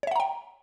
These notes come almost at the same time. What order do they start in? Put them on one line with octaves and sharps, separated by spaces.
C#5 E5 F#5 A#5 G5